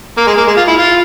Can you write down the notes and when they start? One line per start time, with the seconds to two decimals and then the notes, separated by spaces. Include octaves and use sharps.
0.18 A#3
0.27 G#3
0.38 A#3
0.47 G#3
0.57 F4
0.68 E4
0.78 F4